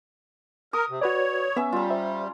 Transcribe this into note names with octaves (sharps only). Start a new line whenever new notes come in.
A#4 D#6
C3
F#4 B4 C#5 D5
B3 C#4 E5
G3 F4 A#5
C5 E5